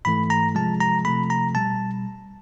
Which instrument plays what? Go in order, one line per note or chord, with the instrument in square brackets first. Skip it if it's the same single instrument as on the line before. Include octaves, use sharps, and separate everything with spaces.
[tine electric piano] G#2 E3 A3 B5
A#5
C3 F3 G#3 A5
A#5
C3 F3 A3 B5
A#5
B2 G3 A5